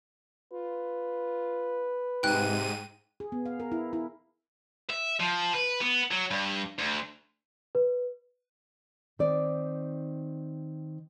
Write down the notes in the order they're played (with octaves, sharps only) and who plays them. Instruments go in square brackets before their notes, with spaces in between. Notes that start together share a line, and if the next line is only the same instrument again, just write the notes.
[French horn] F4 [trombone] B4
[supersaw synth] G#2 D#7 [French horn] C3 [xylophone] G5 F#6
[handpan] G#4
B3
F5
A#4
E4
E4
[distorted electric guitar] E5
F3
B4
B3
F#3
G2
D2
[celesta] B4
[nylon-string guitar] D#3 C4 D5